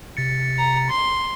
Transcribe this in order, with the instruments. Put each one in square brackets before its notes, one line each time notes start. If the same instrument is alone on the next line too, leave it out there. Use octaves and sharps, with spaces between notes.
[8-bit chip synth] C3 A6 C#7
[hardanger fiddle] A#5
C6